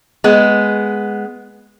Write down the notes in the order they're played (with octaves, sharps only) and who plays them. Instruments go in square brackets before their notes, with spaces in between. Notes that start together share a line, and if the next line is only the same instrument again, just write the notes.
[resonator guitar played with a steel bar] G#3 B3